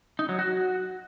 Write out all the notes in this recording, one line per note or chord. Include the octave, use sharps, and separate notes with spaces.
D#4
F#3
F#4